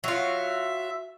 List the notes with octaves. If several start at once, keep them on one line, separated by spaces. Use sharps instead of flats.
F#3 F4 E5